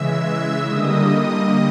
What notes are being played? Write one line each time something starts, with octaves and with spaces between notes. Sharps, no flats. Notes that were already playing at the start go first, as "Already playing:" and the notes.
Already playing: C#3 E3 G#3 E5 E6
E5 E6
D3 G3 A#3 D#5 D#6